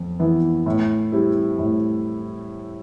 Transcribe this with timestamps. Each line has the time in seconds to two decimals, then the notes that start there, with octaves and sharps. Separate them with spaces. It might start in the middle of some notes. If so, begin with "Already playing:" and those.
Already playing: F2 B3
0.19 E3 B3 E4
0.66 A2
1.12 G3 C4 E4
1.59 A2